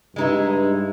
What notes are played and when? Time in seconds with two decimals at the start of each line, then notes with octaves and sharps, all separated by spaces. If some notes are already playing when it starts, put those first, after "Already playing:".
0.16 G2 G#3 D#4 E4